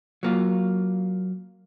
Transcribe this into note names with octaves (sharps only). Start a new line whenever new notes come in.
F#3 A#3 F4